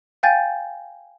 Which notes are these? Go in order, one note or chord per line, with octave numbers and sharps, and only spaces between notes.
F5 G5 G#5 G6 A6